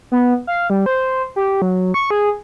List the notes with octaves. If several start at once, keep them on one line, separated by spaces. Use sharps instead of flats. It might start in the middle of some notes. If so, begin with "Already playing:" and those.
B3
F5
G3
C5
G4
F#3
C#6
G#4